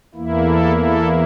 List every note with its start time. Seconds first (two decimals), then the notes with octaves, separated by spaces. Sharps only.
0.14 E2 E3 A#3 E4
0.45 A4
0.77 A4